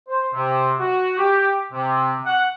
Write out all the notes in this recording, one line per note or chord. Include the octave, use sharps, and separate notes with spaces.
C5
C3
F#4
G4
C3
F#5